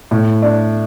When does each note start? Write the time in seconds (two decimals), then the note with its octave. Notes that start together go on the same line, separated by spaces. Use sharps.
0.11 A2
0.42 D4